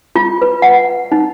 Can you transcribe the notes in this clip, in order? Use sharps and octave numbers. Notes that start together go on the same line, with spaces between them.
F4
B4
F#5
D#4